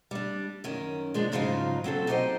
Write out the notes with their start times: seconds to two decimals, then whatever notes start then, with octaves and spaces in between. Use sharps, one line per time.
0.11 G3 D4
0.64 F#2 D#3 C#4
1.14 F3 G#3 D4
1.32 G#2 C#3 F3 F#3 D#4 F4
1.84 F#3 C4 C#4 A4
2.07 D#4 F#4 G4 A#4 C5 D#5